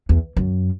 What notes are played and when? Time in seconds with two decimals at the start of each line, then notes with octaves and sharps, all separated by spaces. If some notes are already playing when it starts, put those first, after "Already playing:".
0.09 E2
0.37 F#2